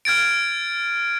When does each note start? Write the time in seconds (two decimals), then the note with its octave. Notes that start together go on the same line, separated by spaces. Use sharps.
0.05 F6 G#6 A6 D7